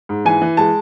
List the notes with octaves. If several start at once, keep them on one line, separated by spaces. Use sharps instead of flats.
G#2
E3 G#5
E3
G#3 A5